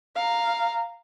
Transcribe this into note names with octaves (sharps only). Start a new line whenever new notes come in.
F5 A#5